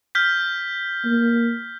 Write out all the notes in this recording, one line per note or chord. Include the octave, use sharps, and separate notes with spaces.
F6 G6 B6
A#3